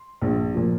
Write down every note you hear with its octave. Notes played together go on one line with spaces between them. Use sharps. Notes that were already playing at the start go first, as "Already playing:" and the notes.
Already playing: C6
A#1
A#2 F3